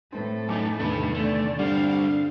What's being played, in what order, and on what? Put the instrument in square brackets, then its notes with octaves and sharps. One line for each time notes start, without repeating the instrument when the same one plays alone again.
[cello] A2 A4 [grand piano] C4 B4
[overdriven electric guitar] F#2 D#4 [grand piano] G#5 A5 D6
[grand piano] E2 C3 D#3 [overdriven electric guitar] D4 B4
[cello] D3 D5 [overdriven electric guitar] A3
[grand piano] G2 F#5 [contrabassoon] D3 [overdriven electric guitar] G3 C4 [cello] F5